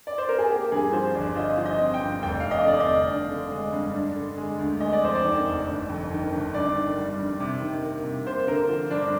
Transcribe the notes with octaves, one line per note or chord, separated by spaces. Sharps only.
D5
C5
A#4
G#4
A#3 G4
G2 G#4
F3 C5
G1 D5
F4 D#5
F3
D#5
C4
G5
G2
F1 G5
F2 F5
D#5
D3 D5
D#5
F1
D4
D3
G#3
G2
D4
D3
G#3
D2
G#3 D#5
D5
F2 C5
D5
D#3
F1
G1
F2
D#3
G1
G2 D5
D#3
G3
G2
C3
D#3
A#3
C3
A#3 C5
D3 A#4
F3
G2 D4